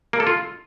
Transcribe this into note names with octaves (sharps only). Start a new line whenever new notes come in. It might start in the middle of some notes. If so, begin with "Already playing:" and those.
A#3
A4
F4